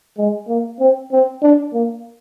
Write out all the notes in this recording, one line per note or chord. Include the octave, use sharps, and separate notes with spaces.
G#3
A#3
C4
C4
D4
A#3